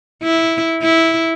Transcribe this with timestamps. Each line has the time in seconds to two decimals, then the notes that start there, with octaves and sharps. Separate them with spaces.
0.23 E4
0.82 E4